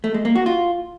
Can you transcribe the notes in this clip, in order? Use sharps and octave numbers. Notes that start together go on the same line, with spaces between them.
A3
G#3
A#3
F#4
F4